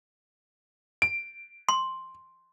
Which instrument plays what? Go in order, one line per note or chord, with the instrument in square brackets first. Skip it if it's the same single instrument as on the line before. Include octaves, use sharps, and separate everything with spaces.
[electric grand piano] D7
[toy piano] C6